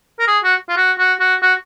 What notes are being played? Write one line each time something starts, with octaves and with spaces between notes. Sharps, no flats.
A#4
G#4
F#4
F4
F#4
F#4
F#4
F#4